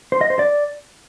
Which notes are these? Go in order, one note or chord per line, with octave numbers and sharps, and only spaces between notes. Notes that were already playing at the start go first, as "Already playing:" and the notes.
C5
D#5
C5
D5